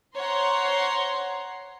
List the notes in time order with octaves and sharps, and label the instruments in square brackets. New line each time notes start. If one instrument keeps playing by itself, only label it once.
[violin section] C5 C#5 F#5 A#5 C6